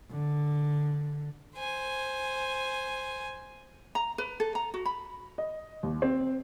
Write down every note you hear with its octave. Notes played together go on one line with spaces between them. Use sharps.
D3
C5 G#5
A#5
B4
A4
A#5
F#4
B5
D#5
D#2
C4